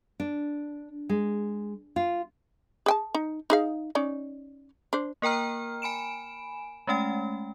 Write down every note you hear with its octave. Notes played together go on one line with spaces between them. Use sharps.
D4
G#3
F4
G#4 G5 A5
D#4
D#4 G#4 F5
C#4 D#4 D5
D4 C5
A#3 A#4 G5 A#5 F6
G#5 B5 D7 E7
G#3 A3 C#4 G5